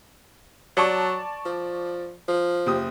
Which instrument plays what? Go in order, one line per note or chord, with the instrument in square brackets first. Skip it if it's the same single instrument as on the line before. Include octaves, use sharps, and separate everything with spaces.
[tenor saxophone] F#3 [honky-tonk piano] D5 A5 C#6
[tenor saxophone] F3
F3
[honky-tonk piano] F#1 G4 D#6